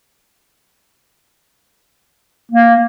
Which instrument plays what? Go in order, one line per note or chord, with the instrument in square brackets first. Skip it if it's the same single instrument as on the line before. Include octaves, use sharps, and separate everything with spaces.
[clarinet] A#3